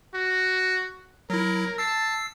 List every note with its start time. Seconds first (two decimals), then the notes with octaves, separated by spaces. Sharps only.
0.14 F#4
1.30 F#3 E4 A#4
1.78 A5 E6 C7